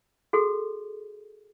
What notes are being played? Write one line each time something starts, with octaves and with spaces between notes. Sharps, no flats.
F#4 G#4 A4